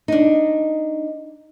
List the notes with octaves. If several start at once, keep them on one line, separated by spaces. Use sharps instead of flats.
D4 D#4